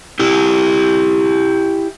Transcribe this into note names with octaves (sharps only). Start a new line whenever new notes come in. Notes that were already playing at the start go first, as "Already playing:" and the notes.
E4 G4